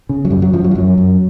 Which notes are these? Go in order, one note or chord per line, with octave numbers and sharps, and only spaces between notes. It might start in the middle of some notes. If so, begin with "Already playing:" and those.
C#3
F#3
F#2 G3
F#3
F#2 F3
F#3
F3
F#2 F#3
F#2